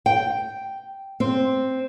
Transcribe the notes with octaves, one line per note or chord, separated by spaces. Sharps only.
G5
C4